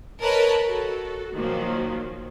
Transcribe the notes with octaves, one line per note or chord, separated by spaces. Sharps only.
A#4 B4 C#5 D#5 A5 B5
F#4 A4
A#2 D#3 F3 F#3 A#3